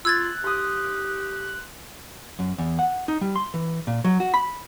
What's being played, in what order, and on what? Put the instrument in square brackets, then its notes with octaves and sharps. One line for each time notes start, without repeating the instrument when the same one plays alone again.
[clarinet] F4 [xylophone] E6 G#6 A6 [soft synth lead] F#6
[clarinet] G4 [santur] C6 D#6
[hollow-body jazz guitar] F#2
E2
F#5
D#4
G3
C6
E3
A#2
F#3
F#4
B5